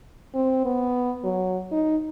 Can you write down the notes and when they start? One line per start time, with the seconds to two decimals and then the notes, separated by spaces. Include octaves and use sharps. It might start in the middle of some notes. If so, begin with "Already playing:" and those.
0.35 C4
0.65 B3
1.24 F#3
1.72 D#4